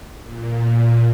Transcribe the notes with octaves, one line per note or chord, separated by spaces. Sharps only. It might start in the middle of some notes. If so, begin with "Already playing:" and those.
A#2